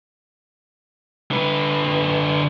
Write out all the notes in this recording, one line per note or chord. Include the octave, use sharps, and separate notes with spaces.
D3 B4